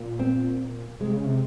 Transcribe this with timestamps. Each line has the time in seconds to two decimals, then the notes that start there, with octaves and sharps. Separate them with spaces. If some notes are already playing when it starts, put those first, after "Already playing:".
Already playing: A#2
0.19 C4
1.00 C3 G#3
1.13 C#3
1.26 C3